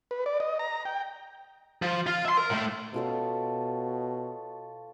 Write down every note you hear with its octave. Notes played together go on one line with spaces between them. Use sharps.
B4
D5
D#5
A#5
G5
F3
F4
E5 C6
A#4
A2 A3
B2 F4 A4 C#5